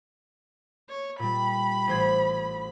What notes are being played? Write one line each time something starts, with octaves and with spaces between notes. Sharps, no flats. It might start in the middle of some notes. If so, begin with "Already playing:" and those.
C#5
A#2 G3 B5
A1 C5 G#6